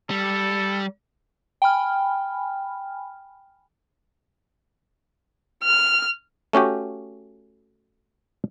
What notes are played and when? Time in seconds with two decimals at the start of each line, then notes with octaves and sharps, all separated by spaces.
0.10 G3 A4
1.62 G5 G#5 B5 F6
5.63 F6
6.53 A3 C#4 F#4 G4